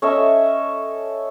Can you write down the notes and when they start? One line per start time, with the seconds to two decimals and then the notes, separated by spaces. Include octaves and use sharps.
0.02 C#4 A4 D#5 E5